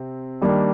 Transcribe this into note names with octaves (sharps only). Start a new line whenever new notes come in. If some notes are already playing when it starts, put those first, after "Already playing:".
Already playing: C3 C4
D#3 G3 A#3 D4